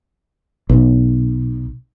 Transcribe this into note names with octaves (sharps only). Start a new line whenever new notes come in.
B1